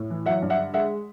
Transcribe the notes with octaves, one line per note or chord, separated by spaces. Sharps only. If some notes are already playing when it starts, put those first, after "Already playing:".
Already playing: A2
E3
F#3 E5 F#5
G2
E5 F#5
D3
G#3 E5 F#5